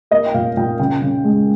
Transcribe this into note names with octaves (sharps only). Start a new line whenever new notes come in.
A#3 D#5
G5
A#2 F5
A#2 G5
C#3 G5
C#3
G#3